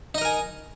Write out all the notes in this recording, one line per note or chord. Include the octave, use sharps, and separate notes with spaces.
D#4 A#4 D#5 G#5